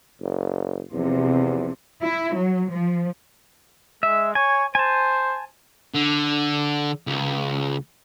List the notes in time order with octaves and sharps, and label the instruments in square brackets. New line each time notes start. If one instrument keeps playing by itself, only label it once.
[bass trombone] F#1
[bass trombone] E2 [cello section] C3 F3
[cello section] E4
F#3
F3
[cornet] G#3 [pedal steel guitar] E5
[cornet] C#5 [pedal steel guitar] G#5
[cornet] C5 [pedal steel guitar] G#5 A5
[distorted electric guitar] D3
C#2